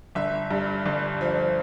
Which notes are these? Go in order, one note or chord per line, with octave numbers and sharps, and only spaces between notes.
G1 E5
G2
G1
F3